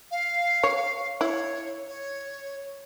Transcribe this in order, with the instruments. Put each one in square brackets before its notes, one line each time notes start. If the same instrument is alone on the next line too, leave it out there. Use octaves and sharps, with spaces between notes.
[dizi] F5
[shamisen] C#5
[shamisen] E4 [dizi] C#5
[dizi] C#5